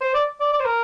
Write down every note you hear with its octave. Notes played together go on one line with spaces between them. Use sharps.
C5
D5
D5
D5
C5
A#4